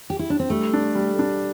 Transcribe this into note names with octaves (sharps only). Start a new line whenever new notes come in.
G4
E4
D4
C4
G3 A3
D4
G3
D4